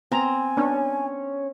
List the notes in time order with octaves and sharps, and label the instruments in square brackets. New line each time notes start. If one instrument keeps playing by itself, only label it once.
[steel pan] B3 A#5 [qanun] C4 [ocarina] G#5
[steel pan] B3 D4 [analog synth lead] C#4